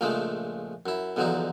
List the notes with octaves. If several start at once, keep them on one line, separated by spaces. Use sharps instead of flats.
A#1 C#3 F3 G#3 A3
F#2 E4
B1 E2 D3 F3 F#3 D#4